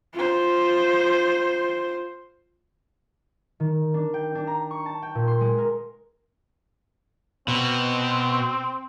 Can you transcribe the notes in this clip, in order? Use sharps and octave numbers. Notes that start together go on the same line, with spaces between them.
F4 C5
D#3
D4
G5
D4
A#5
C#6
A5
G5
A#2
C6
G#3
A#4
B2 C4